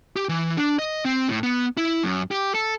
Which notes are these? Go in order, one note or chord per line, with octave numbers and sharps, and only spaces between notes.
G4
E3
D4
D#5
C4
A2
B3
E4
F#2
G4
A4